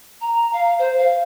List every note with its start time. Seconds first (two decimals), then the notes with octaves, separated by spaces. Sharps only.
0.21 A#5
0.53 F5
0.79 C5
0.97 F5